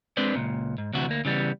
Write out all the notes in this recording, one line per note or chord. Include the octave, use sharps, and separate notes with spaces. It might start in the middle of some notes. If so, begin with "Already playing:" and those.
G#3 C4 D4 B4 D5
C#2 A#2
G#2
D2 C3 E3 F#4
D2 A#3
C#3 E3 G3 B3